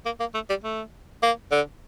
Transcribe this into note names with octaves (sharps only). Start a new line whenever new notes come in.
A#3
A#3
A3
G3
A3
A#3
D3